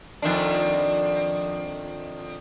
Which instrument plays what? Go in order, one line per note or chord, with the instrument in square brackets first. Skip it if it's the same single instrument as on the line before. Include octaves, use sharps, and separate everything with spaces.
[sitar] F2 D#3 D4